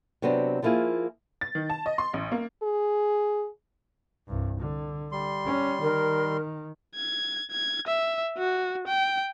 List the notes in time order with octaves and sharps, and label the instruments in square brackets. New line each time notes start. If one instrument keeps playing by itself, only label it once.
[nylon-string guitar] C3 F#3 B3 C4 D4
F3 G3 A#3 E4 F4 G#4
[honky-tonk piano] A6
D#3
A5
D#5
C6
A1
A#3
[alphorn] G#4
[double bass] C2 G2
D3
[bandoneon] G3 C6
[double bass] C#4
[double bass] D#3 [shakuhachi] A#4
[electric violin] G#6
G#6
E5
F#4
G5